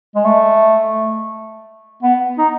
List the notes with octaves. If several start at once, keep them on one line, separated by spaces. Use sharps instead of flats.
G#3
A3
B3
D#4